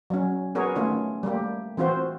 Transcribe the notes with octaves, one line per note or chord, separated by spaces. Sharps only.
F#3 C#4
B3 F#4 G#4 A#4 C#5
D#3 A3 C#4 F4
G3 A3 A#3 G4
E3 C4 F4 F#4 C5